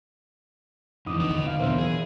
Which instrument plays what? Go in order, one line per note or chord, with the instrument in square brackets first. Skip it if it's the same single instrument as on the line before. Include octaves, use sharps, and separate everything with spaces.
[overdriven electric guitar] F2 E3 [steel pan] D#4 D6 D#6
[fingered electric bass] E1 D#3 D4 [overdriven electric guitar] B4 D#5
[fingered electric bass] E2 D3 D#3
[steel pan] F5
[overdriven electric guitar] B1 D4 [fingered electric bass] E3 B3 [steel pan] A#4 C5 E5
[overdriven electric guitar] G#4